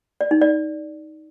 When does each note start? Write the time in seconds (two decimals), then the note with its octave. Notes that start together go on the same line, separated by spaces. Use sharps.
0.21 D5
0.31 D#4
0.41 D5